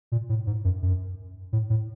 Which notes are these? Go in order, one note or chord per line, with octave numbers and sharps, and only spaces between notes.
A#2
A2
G#2
F#2
F#2
A2
A2